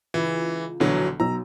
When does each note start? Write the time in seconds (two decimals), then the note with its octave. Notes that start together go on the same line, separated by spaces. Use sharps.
0.14 C#2 E3
0.80 A#1 B2 D3 E3 F#3
1.20 B1 A#5 E6